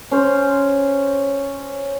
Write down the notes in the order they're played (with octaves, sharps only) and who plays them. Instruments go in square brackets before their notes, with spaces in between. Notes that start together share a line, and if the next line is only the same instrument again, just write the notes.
[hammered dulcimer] C#4 C5